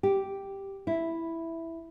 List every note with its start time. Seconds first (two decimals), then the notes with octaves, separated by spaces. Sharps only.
0.03 G4
0.87 E4